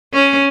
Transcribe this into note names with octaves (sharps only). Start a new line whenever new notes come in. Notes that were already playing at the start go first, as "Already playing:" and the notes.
C#4